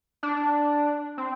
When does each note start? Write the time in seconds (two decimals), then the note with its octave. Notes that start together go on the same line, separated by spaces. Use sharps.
0.23 D4
1.18 C4